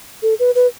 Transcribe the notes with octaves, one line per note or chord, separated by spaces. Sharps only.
A4
B4
B4